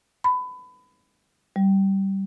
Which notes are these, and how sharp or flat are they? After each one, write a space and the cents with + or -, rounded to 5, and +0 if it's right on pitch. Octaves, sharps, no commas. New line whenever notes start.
B5 +25
G3 -15